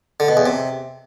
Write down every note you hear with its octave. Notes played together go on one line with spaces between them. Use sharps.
D3
B2
E2
C3